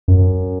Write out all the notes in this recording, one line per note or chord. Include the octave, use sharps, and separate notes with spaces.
F#2